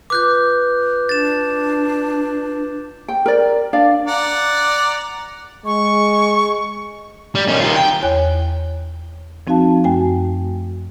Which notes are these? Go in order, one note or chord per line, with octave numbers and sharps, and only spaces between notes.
F4 B4 D6 F#6 G6
D4 A6 E7
G5
A#4 D5
D4 D5 F5
D5 F#5 A#5
G#3 C#6
G3
D#3 C#4
D#3 F4
G5
E2 C#5 G#5 F#6
F3 C4 D#4 F#4 F5 A5
F#2 A3 F#4 G5 G#5